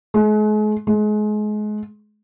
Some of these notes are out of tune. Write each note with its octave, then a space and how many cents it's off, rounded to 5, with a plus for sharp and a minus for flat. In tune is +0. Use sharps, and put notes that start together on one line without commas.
G#3 +40
G#3 +30